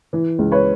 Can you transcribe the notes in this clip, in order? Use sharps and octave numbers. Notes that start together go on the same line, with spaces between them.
E3
C#2
B4 C#5